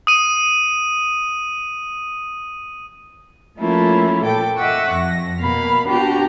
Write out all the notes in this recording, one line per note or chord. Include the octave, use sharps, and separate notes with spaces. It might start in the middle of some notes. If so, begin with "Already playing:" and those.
D#6 D#7
F3 A3 A#3 C#4 E4 F4
A#2 A4 G5 D6
D#5 E5 F#5 C#6 D6 E6
F2 A#6
B2 A#3 F5 B5
B3 D4 F#4 G4 A#5